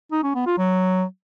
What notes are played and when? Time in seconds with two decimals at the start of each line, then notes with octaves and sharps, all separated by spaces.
0.12 D#4
0.24 C#4
0.35 B3
0.47 F4
0.58 F#3